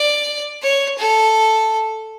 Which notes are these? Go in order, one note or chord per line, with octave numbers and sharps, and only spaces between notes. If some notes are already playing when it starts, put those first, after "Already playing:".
Already playing: D5
C#5
A4